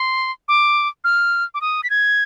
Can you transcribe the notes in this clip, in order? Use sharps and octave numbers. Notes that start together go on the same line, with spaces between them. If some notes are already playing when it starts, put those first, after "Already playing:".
Already playing: C6
D6
F6
D6
D#6
B6
G#6